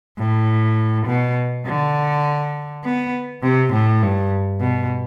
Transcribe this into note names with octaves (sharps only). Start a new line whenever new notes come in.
A2
B2
D3
B3
C3
A2
G2
B2